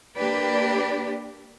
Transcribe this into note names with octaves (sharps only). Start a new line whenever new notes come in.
A#3 D4 G4 B4 D5